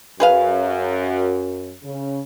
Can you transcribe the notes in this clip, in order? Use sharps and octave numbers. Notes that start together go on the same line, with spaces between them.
F#2 G#4 B4 F5
C#3